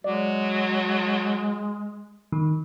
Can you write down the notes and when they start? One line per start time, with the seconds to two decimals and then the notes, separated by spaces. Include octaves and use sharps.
0.04 F#3 G#3 D5
2.32 D#3